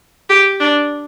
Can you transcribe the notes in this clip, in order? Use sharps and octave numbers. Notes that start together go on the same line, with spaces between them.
G4
D4